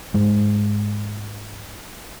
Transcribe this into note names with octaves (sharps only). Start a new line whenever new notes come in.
G#2 G#3